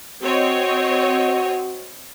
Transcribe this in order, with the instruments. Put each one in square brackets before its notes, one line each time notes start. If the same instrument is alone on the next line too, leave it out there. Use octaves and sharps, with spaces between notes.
[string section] C4 C#5 D#5 [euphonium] F#4